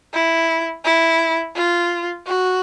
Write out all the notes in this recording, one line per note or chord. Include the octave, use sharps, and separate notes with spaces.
E4
E4
F4
F#4